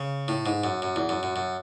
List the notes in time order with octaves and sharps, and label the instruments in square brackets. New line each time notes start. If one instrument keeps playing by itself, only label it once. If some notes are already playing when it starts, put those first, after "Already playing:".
Already playing: [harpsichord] C#3
A2
G#2
F#2
F#2
E2
F#2
F#2
F#2